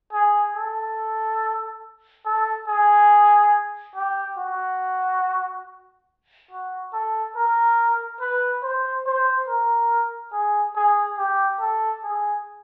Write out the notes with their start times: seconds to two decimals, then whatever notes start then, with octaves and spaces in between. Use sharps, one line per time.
0.13 G#4
0.56 A4
2.26 A4
2.67 G#4
3.96 G4
4.38 F#4
6.51 F#4
6.93 A4
7.36 A#4
8.21 B4
8.63 C5
9.06 C5
9.48 A#4
10.33 G#4
10.75 G#4
11.18 G4
11.61 A4
12.04 G#4